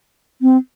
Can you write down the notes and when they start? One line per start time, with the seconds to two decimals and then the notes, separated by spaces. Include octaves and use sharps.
0.42 C4